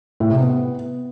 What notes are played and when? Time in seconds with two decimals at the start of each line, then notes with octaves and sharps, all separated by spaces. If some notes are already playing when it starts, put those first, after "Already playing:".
0.20 A2
0.30 C3
0.39 B3